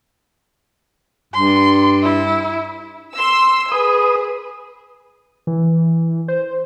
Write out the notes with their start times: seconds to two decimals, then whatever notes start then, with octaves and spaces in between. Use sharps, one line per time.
1.34 G2 C6
2.03 E4
3.15 C6 E6
3.72 G#4 B4 D#6
5.47 E3
6.28 C5